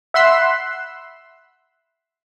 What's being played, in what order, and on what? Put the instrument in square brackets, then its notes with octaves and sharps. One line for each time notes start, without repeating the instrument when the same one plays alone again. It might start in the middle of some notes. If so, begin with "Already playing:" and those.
[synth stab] E5 F#5 B5 C6 E6 F#6